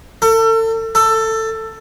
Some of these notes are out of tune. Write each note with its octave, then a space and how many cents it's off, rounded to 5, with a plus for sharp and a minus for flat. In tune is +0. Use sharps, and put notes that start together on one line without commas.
A4 +35
A4 +15